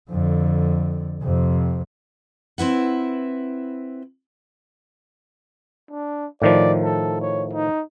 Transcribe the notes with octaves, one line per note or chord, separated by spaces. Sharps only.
F2 D3
F2 C3
C4 E4 B4 F#5
D4
A2 D#3 F3 D5
A4
C#5
D#4